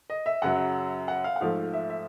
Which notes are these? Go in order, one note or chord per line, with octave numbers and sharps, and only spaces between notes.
D#5
E5
F#2 C#3 F#3 F#5
F#5
F5
F#5
G#2 F3 A3 F5
E5
E5